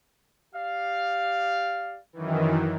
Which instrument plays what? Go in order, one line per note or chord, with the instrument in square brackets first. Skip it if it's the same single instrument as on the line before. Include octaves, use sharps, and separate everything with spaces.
[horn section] G4 D5 F5
[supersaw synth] F#2 D#3 E3